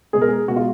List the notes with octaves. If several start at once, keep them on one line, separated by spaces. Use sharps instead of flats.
B2 G#3 G#4
A#4
G#4
B2 G#3 F#4
F4